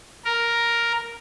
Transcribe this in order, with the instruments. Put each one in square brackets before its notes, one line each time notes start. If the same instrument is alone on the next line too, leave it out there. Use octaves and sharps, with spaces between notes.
[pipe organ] A#4